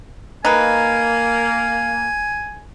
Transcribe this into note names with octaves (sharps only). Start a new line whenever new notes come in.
A#3 D#4 B4 G#5